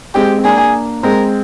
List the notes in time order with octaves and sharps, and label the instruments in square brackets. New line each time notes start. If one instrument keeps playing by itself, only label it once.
[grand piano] G#3 C4 [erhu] G4
[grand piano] C4
[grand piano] A#3 D4 [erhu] G#4
[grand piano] G#3 C4 [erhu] A#4